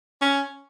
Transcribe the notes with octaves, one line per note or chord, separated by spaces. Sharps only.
C#4